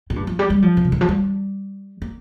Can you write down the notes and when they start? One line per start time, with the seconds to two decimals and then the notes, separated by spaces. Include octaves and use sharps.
0.10 A#2
0.16 G2
0.27 F3
0.39 G3
0.50 G3
0.62 F3
0.77 A#2
0.85 C3
0.92 D#3
1.01 F3
1.09 G3
2.02 A#3